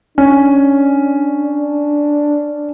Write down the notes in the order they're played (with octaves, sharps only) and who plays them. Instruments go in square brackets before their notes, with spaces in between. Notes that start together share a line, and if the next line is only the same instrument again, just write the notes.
[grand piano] C#4 [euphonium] D4